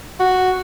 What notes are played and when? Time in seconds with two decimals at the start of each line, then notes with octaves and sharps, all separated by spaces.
0.20 F#4